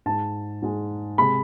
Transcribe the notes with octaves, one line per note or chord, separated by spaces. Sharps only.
G#2 G#3 A5
G#2 G#3
C3 G#3 B5